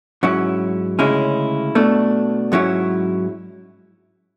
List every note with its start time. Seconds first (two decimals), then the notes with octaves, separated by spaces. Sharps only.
0.23 G#2 F#3 C#4 E4
0.99 D2 C#3 G#3 C#4 E4
1.75 B2 A3 D4
2.52 G#2 F#3 C#4 E4